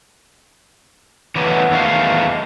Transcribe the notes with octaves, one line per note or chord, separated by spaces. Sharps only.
E3 F#3 A3 B3
E2 D#3 A3 F5